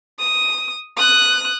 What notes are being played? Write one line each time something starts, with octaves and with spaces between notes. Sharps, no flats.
D#6
D#6 F#6